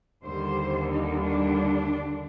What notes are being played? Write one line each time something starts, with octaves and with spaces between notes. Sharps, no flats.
D#2 D3 G3 C5
D#4
D4